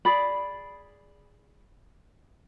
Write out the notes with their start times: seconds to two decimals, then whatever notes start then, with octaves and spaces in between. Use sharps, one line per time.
0.05 G#4 D5 B5